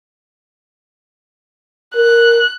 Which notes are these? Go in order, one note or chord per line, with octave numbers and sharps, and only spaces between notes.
A#4 F#6